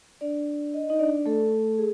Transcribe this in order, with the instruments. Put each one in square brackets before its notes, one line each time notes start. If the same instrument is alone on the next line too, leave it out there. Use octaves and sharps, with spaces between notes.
[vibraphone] D4 D5
D#5
D#4 D#5
D4 D5
A3 A4
G#4